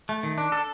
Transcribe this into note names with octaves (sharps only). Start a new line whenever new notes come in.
A3
D#3
D4
A4